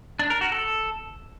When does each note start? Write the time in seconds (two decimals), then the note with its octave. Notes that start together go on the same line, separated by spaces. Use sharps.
0.19 D4
0.30 A#4
0.41 F#4
0.52 A4